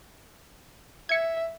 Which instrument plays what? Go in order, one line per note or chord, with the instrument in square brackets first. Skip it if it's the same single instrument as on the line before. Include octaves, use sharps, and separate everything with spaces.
[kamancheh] E5 [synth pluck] G#6 C#7